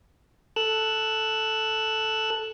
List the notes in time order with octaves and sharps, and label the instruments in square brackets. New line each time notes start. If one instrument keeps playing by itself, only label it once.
[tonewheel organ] A4 E6 F#6